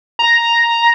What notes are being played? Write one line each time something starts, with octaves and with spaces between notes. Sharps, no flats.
A#5